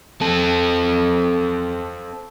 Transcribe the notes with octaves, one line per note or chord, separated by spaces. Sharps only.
C4 A4